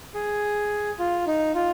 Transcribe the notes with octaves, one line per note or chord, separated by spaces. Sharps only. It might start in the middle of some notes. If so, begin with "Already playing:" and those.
G#4
F4
D#4
F4